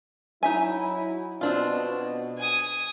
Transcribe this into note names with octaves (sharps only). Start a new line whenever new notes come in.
F#3 D#4 E4 E5 G#5
B2 C4 D4 F4
G#5 D#6